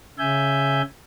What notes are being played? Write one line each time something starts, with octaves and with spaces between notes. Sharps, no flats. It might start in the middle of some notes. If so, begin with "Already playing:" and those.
C#3 E5 G#5 G6